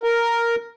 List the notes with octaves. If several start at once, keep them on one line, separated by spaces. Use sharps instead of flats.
A#4